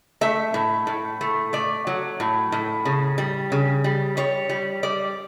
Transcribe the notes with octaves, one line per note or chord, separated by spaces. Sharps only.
A3 E5
A2
A2
A3
A3 D5
F#3
A2
A2
C#3
G3
C#3
G3
G3 C#5
G3
G3 D5